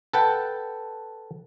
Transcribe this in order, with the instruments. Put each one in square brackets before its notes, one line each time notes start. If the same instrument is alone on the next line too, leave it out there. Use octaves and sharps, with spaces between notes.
[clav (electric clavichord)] A4 B4 F#5 G5 A5